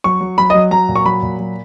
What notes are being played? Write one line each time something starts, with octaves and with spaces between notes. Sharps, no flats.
F#3 C#6
F#3
F#3 B5
F#3 D#5
F#3 A#5
A#2
C#6
F#3 B5
A#2
F#3